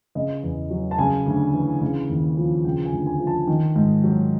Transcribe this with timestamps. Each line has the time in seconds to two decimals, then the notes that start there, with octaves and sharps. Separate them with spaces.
0.15 C#3 D#5
0.43 E2
0.71 F#3
0.91 A5
0.98 C#3 G#5
1.26 D2
1.54 E3
1.81 C#3
2.09 D#2
2.37 F3
2.65 C#3 G5
2.85 G#5
2.92 D2
3.06 G#5
3.20 F3
3.27 A5
3.47 D#3
3.75 G#2
4.04 F#3